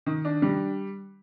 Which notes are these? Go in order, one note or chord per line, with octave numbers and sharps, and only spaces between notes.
D#3
D4
G3